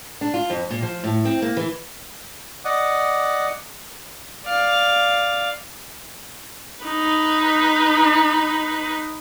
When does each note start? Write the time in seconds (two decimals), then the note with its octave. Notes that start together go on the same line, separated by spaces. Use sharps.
0.21 D4
0.34 F4
0.50 F2
0.71 A#2
0.82 F3
1.04 A2
1.25 C4
1.42 A#3
1.57 E3
2.65 D5 D#5 F#5
4.47 D5 F5
6.84 D#4 B4